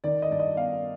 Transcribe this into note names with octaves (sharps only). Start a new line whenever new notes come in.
D#3 D5
D#5
G2 D5
D#5
B3 F5